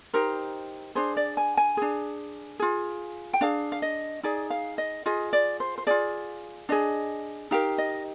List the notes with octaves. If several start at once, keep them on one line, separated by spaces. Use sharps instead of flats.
D#4 G4 A#4 C5
D4 G#4 C5
D5
G#5
G#5
D4 G#4
F4 G#4
G5
D4 G#4 F5
F5
D#5
D#4 G#4 D5
F5
D#5
F4 G#4 D#5
D5
C5
C5
F4 G#4 D5
D4 G#4 D#5
D#4 G4 A#4 F5
D#5